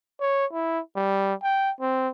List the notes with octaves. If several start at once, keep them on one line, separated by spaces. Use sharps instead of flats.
C#5
E4
G3
G5
C4